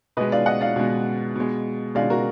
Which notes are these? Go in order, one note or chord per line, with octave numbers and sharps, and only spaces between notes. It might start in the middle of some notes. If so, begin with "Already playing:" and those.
B2 G#3 B4 D#5
D5 F5
D#5 F#5
D5 F5
B2 G#3
B2 G#3
B2 G#3 D5 F5
F#4 A#4